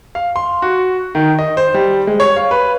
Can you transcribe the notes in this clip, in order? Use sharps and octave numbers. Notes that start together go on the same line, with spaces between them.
F5
C6
F#4
D#3
D#5
C5
G3
G#3
C#5
F5
B4